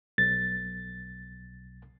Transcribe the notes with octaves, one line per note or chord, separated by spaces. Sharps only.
B1 A6